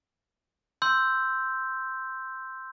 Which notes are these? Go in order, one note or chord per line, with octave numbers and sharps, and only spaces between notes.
C6 E6 G6